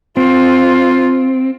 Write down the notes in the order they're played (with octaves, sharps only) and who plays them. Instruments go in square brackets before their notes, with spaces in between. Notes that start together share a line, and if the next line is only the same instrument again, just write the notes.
[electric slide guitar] C4 [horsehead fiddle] F4